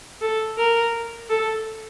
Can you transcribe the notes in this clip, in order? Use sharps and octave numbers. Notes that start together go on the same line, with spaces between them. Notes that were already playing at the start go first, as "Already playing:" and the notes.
A4
A#4
A4